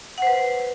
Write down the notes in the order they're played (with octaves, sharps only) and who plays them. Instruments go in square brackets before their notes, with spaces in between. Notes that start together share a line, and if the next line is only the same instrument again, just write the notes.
[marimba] F#5
C5
B4